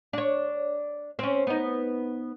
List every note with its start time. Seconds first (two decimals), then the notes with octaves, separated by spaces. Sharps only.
0.13 D4 C#5
1.19 C4 C#4
1.47 B3 D#4